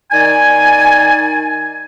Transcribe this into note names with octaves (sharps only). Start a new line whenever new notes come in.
D#3 D#4 D5 G#5